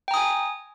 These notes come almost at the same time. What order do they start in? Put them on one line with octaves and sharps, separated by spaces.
G5 A#5 D#6 G#5